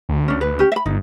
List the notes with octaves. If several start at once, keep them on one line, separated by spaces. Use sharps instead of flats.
D2
C#4 D4
B4
C#4 G4
E5 B5
G1 D#4